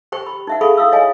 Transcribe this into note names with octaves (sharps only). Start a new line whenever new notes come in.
G4 C5 G5 C#6
B5
D#4 E5 F#5
G#4 A4 F5 B5 C#6
E4 F5 D#6 E6
C#5 D#5 F5 G#5